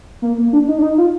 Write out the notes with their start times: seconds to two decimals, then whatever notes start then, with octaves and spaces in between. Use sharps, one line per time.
0.22 A#3
0.38 A#3
0.53 D4
0.68 D#4
0.78 D4
0.82 D#4
0.98 F4